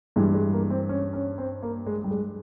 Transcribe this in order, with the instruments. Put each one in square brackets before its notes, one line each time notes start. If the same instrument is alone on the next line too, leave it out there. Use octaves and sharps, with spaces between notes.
[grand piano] G2 E3 G3 G#3
G#3
A#3
C4
C#4
C#4
C4
A#3
G#3
G3
G#3